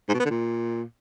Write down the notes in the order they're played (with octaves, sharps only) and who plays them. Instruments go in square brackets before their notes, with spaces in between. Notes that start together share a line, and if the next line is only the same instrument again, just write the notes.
[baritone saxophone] G#2
B2
B3
D3
A#2